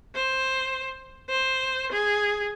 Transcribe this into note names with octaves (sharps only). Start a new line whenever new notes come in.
C5
C5
G#4